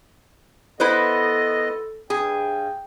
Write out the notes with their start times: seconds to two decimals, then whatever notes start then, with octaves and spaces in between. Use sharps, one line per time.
0.80 B3 E4 A4 B4 C5 D#5
2.10 G2 G#4 G5